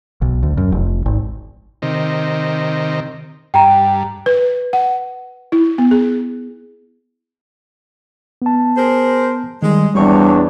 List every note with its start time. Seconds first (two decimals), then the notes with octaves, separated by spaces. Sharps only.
0.22 B1
0.43 D2
0.57 F#2
0.72 F1
1.06 G#1
1.82 C3 D#3
3.54 G2 G5 A#5
4.26 B4
4.73 F#5
5.52 E4
5.78 B3
5.91 G#4
8.42 B3 A5
8.77 G#4 A#4 C5
9.63 D#3 G3 G#3
9.95 E2 G3 C4 D4 C#5 C#6